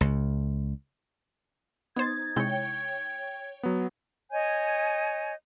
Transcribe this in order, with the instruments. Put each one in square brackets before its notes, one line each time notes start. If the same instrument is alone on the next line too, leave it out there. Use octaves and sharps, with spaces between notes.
[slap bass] C#2
[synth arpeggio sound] B3 C5 [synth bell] D#4 A6 [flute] G#6
[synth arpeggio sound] C3 G#3 E4 [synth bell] C#5 G5
[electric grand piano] F#3 B3
[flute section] C#5 D#5 G#5 G6